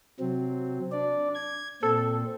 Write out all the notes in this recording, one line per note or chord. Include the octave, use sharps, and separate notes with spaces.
C3 F#3 C4
D4 D5
G#6
A#2 C4 A4